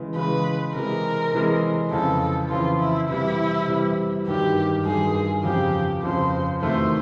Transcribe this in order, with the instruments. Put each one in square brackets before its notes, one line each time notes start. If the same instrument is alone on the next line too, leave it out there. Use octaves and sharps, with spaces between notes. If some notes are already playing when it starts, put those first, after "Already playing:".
Already playing: [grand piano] C#3 E3 G#3
[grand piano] C#3 E3 G#3 [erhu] B4
[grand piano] C3 E3 G#3 [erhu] A#4
[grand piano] C3 E3 G#3
[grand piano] F2 C#3 E3 [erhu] A4
[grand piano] F2 C#3 E3 [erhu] F4
[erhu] E4
[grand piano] C3 E3 G3 [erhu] E4
[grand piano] C3 E3 G3
[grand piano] G2 D#3 F#3 [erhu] G4
[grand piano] G2 D#3 F#3 [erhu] G#4
[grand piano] F2 C#3 F3 [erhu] G4
[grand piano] F2 C#3 F3 [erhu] C5
[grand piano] E2 C3 D#3 F#3 A3 [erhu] C5